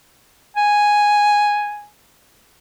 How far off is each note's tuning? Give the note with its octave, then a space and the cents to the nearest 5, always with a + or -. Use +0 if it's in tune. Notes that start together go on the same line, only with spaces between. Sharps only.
G#5 +0